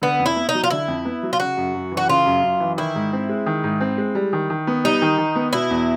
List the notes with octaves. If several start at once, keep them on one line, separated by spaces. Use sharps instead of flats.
D3 B3
F2
E4
B3
D#4
F#3
F4
D3 E4
F2
B3
F#3
F4
C#3 F#4
F#2
F#2
E3
F#4
C#3 F4
F#2
F#2
E3
D#3 E4
G#2
C4
G#3
D#3
G#2
C4
G#3
G3
D#3
D#3
B3
G3 D#4
D#3
D#3
B3
B2 E4
E2